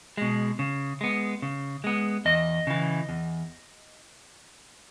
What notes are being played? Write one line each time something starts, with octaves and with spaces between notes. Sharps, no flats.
B2 G#3
C#3
G#3 B3
C#3
G#3 B3
E2 D#5
C#3 E3
E2